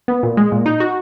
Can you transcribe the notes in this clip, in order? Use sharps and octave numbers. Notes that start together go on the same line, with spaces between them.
B3
A#2
G#3
A#2
D#4
F#4